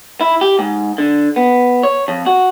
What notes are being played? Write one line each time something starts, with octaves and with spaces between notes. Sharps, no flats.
E4
G4
G#2
D3
B3
C#5
F2
F#4